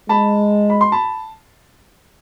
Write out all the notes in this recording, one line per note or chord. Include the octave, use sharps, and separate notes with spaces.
G#3 A5 B5
B5
C6
A5 B5